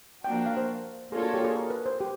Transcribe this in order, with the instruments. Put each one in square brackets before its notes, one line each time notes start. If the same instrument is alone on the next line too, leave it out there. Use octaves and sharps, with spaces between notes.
[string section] F3 A#3 D4 F#4 [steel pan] G5
[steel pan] F#5
F5
C5
[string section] A#3 D4 F4 A4 C#5 [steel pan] G#4
[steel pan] F#4
G4
G#4
A#4
B4
C5
G4